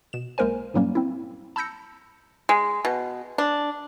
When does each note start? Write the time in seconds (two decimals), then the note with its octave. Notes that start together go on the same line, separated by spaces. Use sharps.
0.13 B2 E7
0.38 B1 G#3 A#3 A#4 C5 G#5
0.74 G2 A#2 F#3 G3 A#3 C#4
0.95 C4 E4
1.56 A5 B5 E6 G6 A#6 C#7
2.49 G#3
2.85 B2
3.38 D4